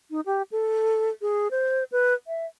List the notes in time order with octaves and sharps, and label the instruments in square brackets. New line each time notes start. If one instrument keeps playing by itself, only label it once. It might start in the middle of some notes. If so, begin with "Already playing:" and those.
[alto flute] D#4
G4
A4
G#4
C5
B4
E5